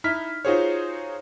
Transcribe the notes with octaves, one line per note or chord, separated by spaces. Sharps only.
D#4 E4 F6 B6
D#4 F4 F#4 G#4 C5 C#5